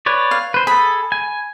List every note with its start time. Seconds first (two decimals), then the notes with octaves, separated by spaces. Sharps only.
0.06 B4 C#5 D5
0.31 F5
0.54 B4 C5
0.67 G#4 A4 B5
1.12 G#5